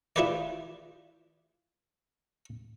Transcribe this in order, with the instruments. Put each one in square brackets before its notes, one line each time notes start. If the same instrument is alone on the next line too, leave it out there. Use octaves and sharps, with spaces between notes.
[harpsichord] E4 F4 G#4 B4 C5 D5